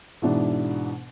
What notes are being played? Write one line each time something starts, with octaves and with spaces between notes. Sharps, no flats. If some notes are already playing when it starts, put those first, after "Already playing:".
G#2 B2 E3 D4